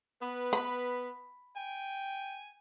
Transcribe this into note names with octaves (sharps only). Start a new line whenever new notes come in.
B3 B4
B5
G5 G#5